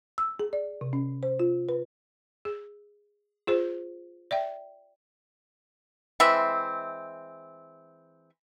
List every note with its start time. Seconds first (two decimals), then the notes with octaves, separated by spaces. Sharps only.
0.18 E6
0.40 G#4
0.53 D5
0.81 C3
0.93 C#4
1.23 C5
1.40 F4
1.69 B4
2.45 G#4
3.47 F4 G#4 C5
4.31 D5 E5 G5
6.20 E3 G#3 C4 E5